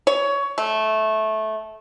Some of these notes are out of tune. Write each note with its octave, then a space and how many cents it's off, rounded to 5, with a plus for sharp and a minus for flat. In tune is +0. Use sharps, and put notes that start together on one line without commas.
C#5 +20
A3 -15